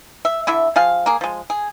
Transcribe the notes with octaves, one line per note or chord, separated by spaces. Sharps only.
E5
D3 E4 E5
F3 G#4 F5
A#3 G#4
F3 G#3
G#4